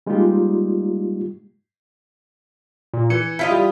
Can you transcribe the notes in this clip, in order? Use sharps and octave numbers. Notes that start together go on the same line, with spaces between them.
G3 G#3 A#3 D#4 F4 G4
A#2
E3 C#7
E4 F4 D#5 B6
G3 G4